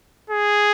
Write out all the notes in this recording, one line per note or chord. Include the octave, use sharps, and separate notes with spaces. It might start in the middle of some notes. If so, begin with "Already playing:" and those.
G#4